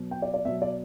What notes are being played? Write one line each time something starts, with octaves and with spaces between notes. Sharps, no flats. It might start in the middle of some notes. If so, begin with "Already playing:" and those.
Already playing: B2 F#3
G5
D5
D5
B2 F#3 E5
D5